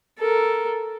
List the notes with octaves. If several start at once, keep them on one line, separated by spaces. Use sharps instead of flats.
A4 A#4